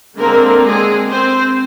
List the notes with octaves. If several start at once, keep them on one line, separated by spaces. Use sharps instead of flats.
D3 G#3 A#3 C4 A#4
G#3 G#4
C4 C5